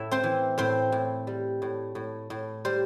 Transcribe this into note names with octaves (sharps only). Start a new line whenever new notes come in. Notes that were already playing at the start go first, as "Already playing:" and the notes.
Already playing: A2 E4 E5
C4 C5
E3
A2 C4 C5
A2
G3
A2
A2
A2
G3 C5